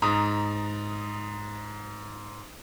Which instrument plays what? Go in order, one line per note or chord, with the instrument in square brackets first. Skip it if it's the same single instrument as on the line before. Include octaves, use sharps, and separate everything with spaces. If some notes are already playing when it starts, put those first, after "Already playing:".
[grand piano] G#2 A#5 D#6